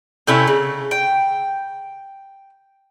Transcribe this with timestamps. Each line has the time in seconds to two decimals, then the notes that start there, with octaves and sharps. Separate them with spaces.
0.27 C3 A3 C#4 E4
0.47 C#3
0.91 G5